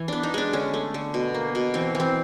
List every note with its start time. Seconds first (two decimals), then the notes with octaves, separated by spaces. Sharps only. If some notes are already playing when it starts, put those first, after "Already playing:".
Already playing: E3
0.08 B3 D4
0.23 D#4
0.34 G#3 D4
0.53 D3 C#4
0.74 A3
0.94 D3
1.14 B2
1.34 A#3
1.55 B2
1.74 E3 C4
1.95 E3
2.00 C4